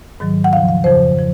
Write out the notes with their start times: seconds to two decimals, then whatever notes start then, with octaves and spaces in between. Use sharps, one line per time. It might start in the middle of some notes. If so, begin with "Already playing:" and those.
0.20 G#2 D#3 F#3
0.44 F#5
0.52 D#2 C#3 F3 F5
0.69 F5
0.84 F2 C#3 F3 C5
1.19 F3